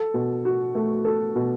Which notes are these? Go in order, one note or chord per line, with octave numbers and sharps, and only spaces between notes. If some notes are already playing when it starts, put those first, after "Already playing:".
Already playing: A4
B2
F#4
A3
A4
B2